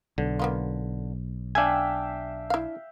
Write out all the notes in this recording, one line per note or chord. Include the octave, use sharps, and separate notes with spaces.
B1 D3
A#3 B3 F4
D4 E5 F5 G5 G#5
E4 F5